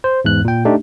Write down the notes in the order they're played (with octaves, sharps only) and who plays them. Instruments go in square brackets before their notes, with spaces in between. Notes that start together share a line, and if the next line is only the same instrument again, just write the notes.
[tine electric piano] C5
E2 G#2 F#6
A#2 G5
A3 D4 D#4 G4